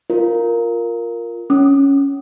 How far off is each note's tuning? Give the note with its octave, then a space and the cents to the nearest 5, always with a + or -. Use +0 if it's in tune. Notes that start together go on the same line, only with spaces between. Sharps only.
F4 +0 A#4 +0
C#4 +0 D6 +30